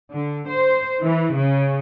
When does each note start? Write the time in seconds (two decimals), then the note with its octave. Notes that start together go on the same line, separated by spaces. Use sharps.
0.12 D3
0.47 C5
1.02 E3
1.36 C#3